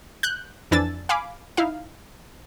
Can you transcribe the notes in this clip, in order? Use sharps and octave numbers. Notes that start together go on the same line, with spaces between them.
F#6 G6
F2 E3 D4 G#5 E6 A6
F5 G#5 B5 D6
D#4 E4 F5